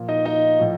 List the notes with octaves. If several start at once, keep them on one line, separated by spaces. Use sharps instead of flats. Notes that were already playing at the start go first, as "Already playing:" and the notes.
Already playing: A#2 F3
D#4 D#5
D#4 D#5
A2 F3